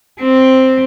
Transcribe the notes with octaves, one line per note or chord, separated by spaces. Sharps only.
C4